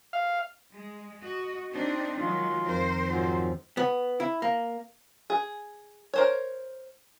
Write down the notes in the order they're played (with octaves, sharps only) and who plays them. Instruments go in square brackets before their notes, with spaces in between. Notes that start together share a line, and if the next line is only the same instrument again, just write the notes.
[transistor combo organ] F5
[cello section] G#3
F#4 D#5
C4 D4 D#4
[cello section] D#3 F#3 [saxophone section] G#3 F4
[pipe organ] F2 D#3 C4 [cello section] A#4 C5
[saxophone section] G#2 F3 F#3
[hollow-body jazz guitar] B3
E4
A#3
[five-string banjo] G#4
A#4 C5 C#5